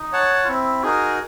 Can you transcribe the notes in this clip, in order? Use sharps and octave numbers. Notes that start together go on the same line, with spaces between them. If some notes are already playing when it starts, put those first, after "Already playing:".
Already playing: D#4
C#5 F#5 A5
F4
C4 E4
D#4 F#4 G#4 A#4